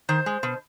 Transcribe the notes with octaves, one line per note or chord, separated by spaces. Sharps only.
D#3 C5
G#3
B2